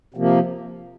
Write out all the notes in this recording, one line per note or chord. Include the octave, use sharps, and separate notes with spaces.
C3 F3 A#3